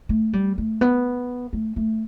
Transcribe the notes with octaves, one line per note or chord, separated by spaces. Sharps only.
A3
G3
A3
B3
A3
A3